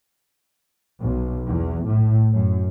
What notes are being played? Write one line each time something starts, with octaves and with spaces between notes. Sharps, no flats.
B1
E2
A2
F#2